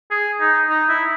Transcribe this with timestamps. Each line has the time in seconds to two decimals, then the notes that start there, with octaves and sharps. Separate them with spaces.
0.11 G#4
0.40 D#4
0.70 D#4
0.89 E4